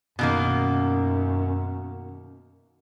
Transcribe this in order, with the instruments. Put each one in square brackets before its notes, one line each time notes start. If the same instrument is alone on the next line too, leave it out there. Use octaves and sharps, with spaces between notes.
[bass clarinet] F#2 [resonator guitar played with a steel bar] B2 D#3 A#3